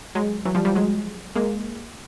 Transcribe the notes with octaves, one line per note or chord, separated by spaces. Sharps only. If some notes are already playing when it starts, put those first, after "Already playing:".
F#3 G#3
E3 F#3
F3 G3
F3 G3
F#3 G#3
G#3 A#3